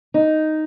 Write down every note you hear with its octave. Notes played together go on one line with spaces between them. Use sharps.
D#4